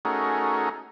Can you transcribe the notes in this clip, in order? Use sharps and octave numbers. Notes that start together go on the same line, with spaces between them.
A3 C#4 D#4 F#4 G#4 A#4